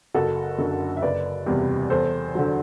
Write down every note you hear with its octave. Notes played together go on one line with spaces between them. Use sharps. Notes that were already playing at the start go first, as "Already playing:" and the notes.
F#1 F#4 A4
F#2 D3
E5
F#1 B4 D5
E2 C3 G3
E2 A4 C5
D3 F#3